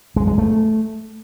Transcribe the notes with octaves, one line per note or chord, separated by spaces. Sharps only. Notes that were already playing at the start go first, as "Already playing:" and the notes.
G#3
G#3
A3